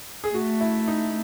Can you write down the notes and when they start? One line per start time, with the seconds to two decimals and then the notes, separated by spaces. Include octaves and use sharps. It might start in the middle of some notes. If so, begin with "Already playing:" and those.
0.24 G#4
0.34 A3 F#4
0.61 E4
0.88 D#4